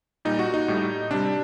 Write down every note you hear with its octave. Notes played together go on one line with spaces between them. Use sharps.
A#2 G3 D#4
F#4
D#4
A2 G3
C3 G3 D4